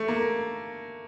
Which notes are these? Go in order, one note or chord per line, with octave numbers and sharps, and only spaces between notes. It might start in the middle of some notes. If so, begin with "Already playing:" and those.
Already playing: A3
A#3